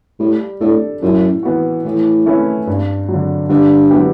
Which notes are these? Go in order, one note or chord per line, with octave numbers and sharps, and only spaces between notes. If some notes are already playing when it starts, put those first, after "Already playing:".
A2 G3
A2 D4 A4
F#2 A2
E3 B3 F#4
A2 E3
A3 C#4 E4 B4
G2
D3 F#3
G2 D3
F#3 B3 E4 G4